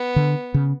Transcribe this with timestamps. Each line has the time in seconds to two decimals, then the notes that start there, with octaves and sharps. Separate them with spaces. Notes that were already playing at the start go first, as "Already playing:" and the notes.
Already playing: B3
0.16 D3
0.54 C#3